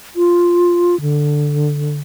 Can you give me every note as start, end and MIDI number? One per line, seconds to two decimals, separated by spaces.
0.16 0.99 65
1.01 2.00 50